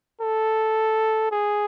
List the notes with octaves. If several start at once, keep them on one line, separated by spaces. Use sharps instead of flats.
A4
G#4